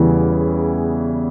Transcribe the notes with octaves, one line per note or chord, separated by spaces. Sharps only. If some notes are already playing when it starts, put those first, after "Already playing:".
Already playing: E2 C#3 E3 G3